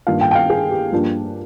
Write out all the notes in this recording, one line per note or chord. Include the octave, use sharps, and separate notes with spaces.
G2 D#3 A#3 D4 F4 F5
G5
G5
F5
G#4
G4
G2 F3 A#3 D4